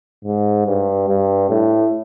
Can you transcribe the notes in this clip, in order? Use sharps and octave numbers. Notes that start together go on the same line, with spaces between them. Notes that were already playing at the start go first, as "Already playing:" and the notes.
G#2
G2
G2
A2